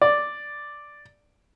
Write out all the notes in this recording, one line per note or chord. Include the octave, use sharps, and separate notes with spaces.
D5